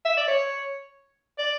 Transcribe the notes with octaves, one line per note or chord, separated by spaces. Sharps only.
E5
D5
C#5
D5